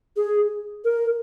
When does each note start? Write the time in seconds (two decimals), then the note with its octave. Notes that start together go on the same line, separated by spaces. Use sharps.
0.17 G#4
0.85 A#4